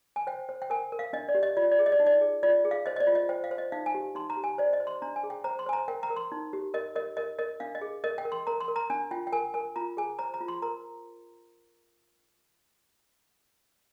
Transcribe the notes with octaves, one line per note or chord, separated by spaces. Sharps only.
G#5
C5 G5
C5
G5
A#4 G#5
A#4
F5
D4 D#5
D5
G4
D#5
F4 D5
D5
G#4
D#5
D5
D#4
D5
G#4
F4 D5
G#4
F5
C5 D#5
D#5
D5
F4
D#5
C5 G5
F5
C5
D#5
D#4 F5
G#5
G4
D#4 C6
A#5
G4
G#5
C5 D5
D#5
C5
C6
D4 A#5
G#5
G#4
G5
C5 A#5
C6
C5 G#5
A#5
A#4 G5
A#5
A#4
C6
D#4
G4
A#4 D#5
A#4 D#5
A#4 D#5
A#4 D#5
D4 F5
D#5
G#4
A#4 D#5
G5
A#4
C6
A#4 A#5
C6
A#4
A#5
D4 G#5
F4 G5
G5
A#4 G#5
A#4 G#5
F4 A#5
G#4 G#5
C5 A#5
A#5
F4
C6
A#4 A#5